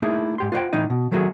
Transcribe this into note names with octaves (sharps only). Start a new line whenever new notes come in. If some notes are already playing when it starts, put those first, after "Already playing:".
A3 A#3 D#4 E4 G#4
G#2 G4 C6
F4 B4 C5 D5 F#5 G5
A2 E3 D#4 D#5
B2
D#3 F#3 A3 A#3 F#4 G#4